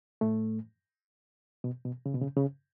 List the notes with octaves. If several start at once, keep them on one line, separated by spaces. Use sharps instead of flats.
A2 A3
B2
B2
C#3
B2
C#3
C#3